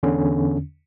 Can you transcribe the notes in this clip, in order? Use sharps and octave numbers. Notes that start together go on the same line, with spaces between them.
E2 D3 C#4